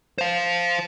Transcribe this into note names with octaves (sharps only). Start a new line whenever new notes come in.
C5 F5